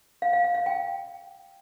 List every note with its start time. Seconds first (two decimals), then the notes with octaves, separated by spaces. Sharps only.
0.22 F5
0.33 F5
0.44 F5
0.55 F5
0.66 G5